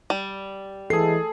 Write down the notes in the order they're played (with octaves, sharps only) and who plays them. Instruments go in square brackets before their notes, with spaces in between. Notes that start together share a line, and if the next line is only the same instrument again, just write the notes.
[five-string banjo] G3
[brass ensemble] E3 G#3 [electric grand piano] G#4 C7 [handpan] A4